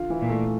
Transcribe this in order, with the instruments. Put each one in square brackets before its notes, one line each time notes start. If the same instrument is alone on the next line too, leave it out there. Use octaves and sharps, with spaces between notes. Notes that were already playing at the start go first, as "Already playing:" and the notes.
Already playing: [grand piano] D3 F4
E3
[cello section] A#2
[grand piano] A3